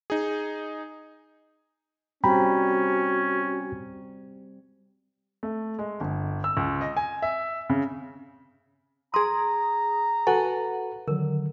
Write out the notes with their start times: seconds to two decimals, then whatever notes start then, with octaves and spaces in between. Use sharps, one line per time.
0.10 D#4 G#4
2.24 G3 C4 C#4 F#4 G4 G5 A#5 B5
5.43 A3
5.79 G#3
6.00 G1
6.44 E6
6.57 C#2
6.81 D#5
6.97 G#5
7.22 E5
7.70 C#3
9.14 G#4 A#5 C6 D#6
10.27 F#4 A4 B4 F#5 G#5
11.08 D3 D#3 F#3 A#4